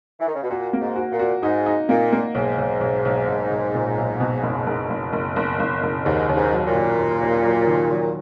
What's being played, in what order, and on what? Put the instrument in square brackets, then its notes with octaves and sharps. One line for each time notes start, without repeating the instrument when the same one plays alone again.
[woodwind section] E3
D#3
C#3
B2
[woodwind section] A#2 [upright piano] F#4
[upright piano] A#3
[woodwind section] G#2
[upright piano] F#4
[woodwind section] A#2
[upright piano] F#4
[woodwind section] G#2 [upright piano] D#4
[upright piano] D#4
[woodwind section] A#2 [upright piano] A#3
[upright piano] A#3
[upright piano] B1 [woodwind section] G#2
[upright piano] B1
B1
B1
B1
B1
A#2
B1
B2
F#1
F#1
F#1
F#1
F#1
F#1
F#1
[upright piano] D#2 [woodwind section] G#2
[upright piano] D#2
[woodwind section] G#2
[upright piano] F#3
[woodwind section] A#2
[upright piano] D#2
D#2
D#2
F#3
D#3
F#3